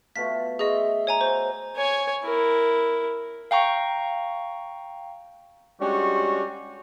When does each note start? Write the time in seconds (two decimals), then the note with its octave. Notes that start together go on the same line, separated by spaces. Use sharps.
0.16 B2 A3 F4 B6
0.59 G#4 D#5 E5 C6 C#6
1.07 C#5 G#5 A#5
1.21 F#4 C5 C6
1.76 C#5 G#5
2.24 E4 A#4
3.51 F5 G5 A#5 C#6
5.81 G3 G#3 C#4 D4 F#4